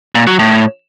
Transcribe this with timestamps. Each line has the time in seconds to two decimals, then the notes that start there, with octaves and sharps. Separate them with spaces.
0.15 A#2
0.27 F#3
0.39 A2